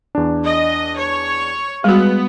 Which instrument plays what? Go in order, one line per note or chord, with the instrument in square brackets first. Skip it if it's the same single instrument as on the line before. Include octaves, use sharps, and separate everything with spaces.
[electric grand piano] E2 D4
[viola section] D#5
C#5
[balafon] G3 F#4 [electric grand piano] G#3 [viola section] B3